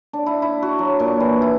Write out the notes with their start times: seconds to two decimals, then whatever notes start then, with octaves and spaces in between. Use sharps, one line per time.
0.13 D4
0.26 E4
0.42 E4
0.62 F#4
0.79 F#3
1.00 A#2
1.20 E3
1.42 E4